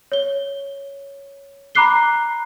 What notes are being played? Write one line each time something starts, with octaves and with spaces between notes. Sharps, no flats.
C#5 G7
A#5 B5 D6 F#6 C7 G7